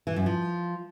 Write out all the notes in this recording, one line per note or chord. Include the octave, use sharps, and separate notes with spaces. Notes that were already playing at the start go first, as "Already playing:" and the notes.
E3
F#2
F3